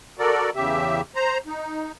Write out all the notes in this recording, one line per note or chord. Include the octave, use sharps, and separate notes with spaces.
F#4 A4 A#4 D5
E2 C#3 G4 E5
C5 A#5
D#4